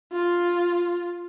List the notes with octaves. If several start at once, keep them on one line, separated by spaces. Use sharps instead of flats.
F4